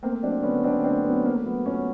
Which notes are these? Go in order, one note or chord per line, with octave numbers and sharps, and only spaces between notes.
A3 A#3 C4
F#3 C4 D4
D3 B3 C#4
D3 C4 D4
A3 C4 D4
F#3 B3 C#4
A3 A#3 C4
F#3 B3
A#2 B3 C#4